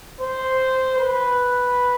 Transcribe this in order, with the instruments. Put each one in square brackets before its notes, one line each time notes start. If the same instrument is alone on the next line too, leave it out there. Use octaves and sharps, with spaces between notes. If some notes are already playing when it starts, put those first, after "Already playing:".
[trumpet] C5
B4